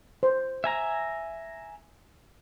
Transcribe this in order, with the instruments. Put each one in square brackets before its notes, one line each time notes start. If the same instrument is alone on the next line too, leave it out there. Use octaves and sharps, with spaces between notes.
[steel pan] C5
[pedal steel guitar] E5 G#5 A#5